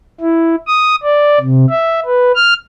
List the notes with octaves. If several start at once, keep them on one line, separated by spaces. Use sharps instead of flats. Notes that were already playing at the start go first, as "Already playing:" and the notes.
E4
D#6
D5
C3
E5
B4
F6